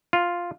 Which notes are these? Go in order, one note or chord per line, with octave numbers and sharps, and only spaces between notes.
F4